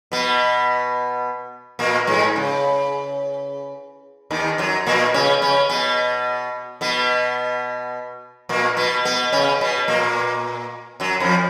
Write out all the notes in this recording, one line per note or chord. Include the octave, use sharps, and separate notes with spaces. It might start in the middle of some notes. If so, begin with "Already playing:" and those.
B2 B3
A#2 A#3
G#2 G#3
C#3
D#2 D#3
F#2 F#3
A#2 A#3
C#3 C#4
C#3 C#4
B2 B3
B2 B3
A#2 A#3
B2 B3
B2 B3
C#3 C#4
B2 B3
A#2 A#3
F#2 F#3
F2 F3